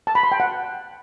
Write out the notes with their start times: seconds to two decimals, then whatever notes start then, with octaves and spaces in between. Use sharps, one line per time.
0.07 A5
0.15 B5
0.23 C6
0.32 G5
0.40 F#5